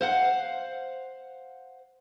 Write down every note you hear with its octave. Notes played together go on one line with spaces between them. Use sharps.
C5 F5 F#5